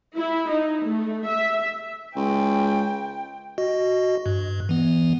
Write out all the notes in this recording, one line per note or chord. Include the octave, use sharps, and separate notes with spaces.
E4
D#4
A3
E5
C#2 G5
F#4 D#5
G2
E3 B3